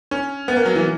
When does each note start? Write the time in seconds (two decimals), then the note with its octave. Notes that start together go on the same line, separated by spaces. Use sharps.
0.11 C#4
0.48 B3
0.56 A#3
0.66 F#3
0.75 E3